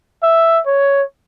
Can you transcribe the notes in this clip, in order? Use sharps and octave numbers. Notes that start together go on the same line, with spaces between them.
E5
C#5